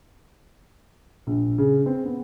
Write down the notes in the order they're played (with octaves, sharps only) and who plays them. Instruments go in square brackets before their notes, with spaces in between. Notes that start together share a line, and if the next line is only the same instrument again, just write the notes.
[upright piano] A#1
C#3
C4
B3